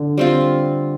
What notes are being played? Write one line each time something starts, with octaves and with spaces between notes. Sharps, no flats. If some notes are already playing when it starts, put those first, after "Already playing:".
Already playing: D3
G3 C4 F4